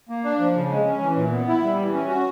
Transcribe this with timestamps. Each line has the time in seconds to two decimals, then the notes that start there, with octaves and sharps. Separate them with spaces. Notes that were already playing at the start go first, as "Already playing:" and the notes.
0.09 A#3
0.24 D4
0.39 F3
0.55 C#3
0.70 G#3
0.86 C#4
1.02 E3
1.16 A#2
1.31 B3
1.48 E4
1.62 G3
1.78 E3
1.93 C#4
2.08 F#4